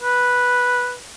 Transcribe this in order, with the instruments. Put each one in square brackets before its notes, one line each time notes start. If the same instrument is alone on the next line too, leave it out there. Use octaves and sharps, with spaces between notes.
[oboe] B4